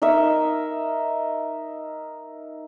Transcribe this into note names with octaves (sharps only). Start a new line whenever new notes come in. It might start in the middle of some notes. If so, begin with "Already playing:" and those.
D#4 A#4 D#5 E5